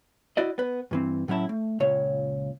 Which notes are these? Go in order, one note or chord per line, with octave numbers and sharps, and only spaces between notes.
E4 F#4 D5 D#5
B3 B4
G2 E3 C4
A2 F#3 C#4 E4 A5
A3
C#2 A#2 C#5